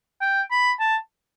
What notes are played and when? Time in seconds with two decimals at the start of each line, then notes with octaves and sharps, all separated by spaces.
0.21 G5
0.51 B5
0.80 A5